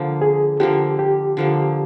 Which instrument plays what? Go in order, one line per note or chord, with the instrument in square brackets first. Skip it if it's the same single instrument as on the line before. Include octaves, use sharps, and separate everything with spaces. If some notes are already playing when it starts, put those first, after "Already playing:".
Already playing: [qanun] D3 F3 A#3
[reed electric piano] G#4
[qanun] D3 F3 A#3 [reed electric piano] G4
[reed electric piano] G4
[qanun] D3 F3 A#3